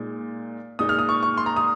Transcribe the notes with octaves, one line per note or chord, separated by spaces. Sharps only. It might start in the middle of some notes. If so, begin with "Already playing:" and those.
Already playing: A#2 G#3 D#4
A#2 G#3 D#4 D#6
F6
D#6
C#6
C#6
C6
A#5
D#6